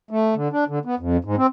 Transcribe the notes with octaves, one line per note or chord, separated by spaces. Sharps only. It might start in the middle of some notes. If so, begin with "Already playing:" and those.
A3
D3
D4
D3
B3
F2
G#2
C4